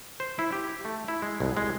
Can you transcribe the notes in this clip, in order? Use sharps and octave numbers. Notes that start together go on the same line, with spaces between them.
C5
E4
G4
A3
E4
G#3
C2
G#3